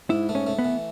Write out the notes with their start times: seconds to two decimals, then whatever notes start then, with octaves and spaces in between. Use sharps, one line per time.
0.10 G#2 E4
0.29 A3
0.35 C#4
0.47 A3
0.59 B3
0.65 E3